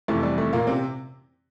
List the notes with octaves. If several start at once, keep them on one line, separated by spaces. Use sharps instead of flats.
F2 C3 E3 A3
G3
A3
A#2 A#3
C3 C4